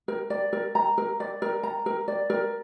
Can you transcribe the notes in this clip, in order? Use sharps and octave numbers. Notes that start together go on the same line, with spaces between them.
A#4
D5
A#4
A#5
A#4
D5
A#4
A#5
A#4
D5
A#4